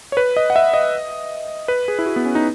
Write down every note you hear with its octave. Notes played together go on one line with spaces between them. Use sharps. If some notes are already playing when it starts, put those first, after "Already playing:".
C#5
B4
D#5
F#5
E5
D#5
B4
G#4
E4
F#4
B3
C#4
D#4